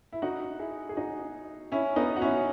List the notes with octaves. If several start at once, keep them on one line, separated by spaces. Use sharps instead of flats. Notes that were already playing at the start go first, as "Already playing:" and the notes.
E4
D#4 F#4
E4 G#4
G#4
D#4 F#4
C#4 E4
B3 D#4
F#4
C#4 E4